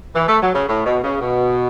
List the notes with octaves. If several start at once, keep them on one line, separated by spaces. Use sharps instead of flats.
E3
A3
F#3
C#3
A2
B2
C#3
B2